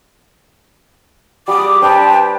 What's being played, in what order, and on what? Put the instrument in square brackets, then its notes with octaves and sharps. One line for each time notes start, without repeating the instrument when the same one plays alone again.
[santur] G3 G4 [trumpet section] G#4 F#5 D#6 [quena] D6
[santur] D4 C5 [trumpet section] B4 A5 [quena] G5